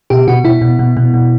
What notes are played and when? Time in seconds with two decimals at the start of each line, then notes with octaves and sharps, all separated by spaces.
0.10 B2 G4
0.27 B2 F#4
0.44 B2 E4
0.61 B2
0.79 B2
0.97 B2
1.14 B2